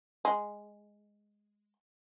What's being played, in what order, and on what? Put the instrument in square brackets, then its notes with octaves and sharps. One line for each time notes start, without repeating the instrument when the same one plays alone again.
[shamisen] G#3